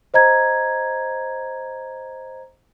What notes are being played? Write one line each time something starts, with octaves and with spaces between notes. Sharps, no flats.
C5 D#5 A#5 G#6